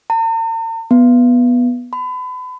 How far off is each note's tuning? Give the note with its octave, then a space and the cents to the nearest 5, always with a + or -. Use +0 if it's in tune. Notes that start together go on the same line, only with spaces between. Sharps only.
A#5 -45
B3 -10
B5 +35